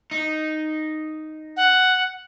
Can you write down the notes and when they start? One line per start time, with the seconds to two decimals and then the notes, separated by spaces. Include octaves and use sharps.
0.11 D#4
1.56 F#5